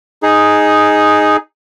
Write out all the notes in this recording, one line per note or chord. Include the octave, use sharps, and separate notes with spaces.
D#4 G#4